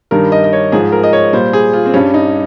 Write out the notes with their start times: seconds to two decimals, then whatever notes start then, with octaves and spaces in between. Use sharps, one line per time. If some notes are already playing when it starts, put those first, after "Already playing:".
0.11 G2 D#3 G3 A#4
0.32 D#5
0.44 D#5
0.53 C#5
0.72 G#2 F3 G#4
0.92 A#4
1.04 D#5
1.13 C#5
1.33 A#2 G3 C5
1.53 G#4
1.73 F4
1.86 C4
1.94 G2 G3 C#4
2.14 D#4